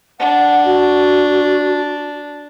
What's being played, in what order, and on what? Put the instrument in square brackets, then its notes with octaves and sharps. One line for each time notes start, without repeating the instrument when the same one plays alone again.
[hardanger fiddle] D4 [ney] F#5
[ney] F#4